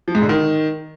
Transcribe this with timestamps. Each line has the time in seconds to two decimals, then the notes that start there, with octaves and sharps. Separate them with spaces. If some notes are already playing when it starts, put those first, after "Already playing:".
0.08 F3
0.15 G#2
0.22 D3
0.29 D#3